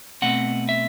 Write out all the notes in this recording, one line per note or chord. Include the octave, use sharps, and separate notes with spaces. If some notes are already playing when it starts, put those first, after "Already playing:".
B2 A3 C4 F#5
E5